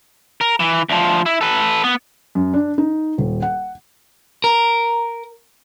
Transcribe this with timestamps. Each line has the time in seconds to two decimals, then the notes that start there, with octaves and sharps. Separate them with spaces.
0.41 A#4
0.60 E3
0.89 D2 F3
1.26 E4
1.41 A4 B4
1.84 B3
2.35 F#2
2.54 D4
2.78 D#4
3.18 D#1
3.42 F#5
4.44 A#4